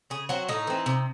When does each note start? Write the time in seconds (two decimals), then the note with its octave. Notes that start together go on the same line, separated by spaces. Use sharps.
0.10 C#3 G#4
0.29 F#3 C4 F#4
0.48 A2 D#4
0.67 E3 C4
0.86 C3